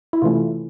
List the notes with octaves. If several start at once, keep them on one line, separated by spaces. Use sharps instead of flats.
E4
C3 E3 A3 C#4 F4